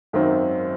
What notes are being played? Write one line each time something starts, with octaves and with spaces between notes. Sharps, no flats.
G#1 F#2 D#3 F#3 C4